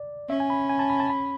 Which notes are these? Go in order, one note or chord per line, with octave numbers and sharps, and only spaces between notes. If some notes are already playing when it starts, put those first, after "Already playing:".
Already playing: D5
C#4 E5
G#5
B5
G#5
A5
B5
A5
B5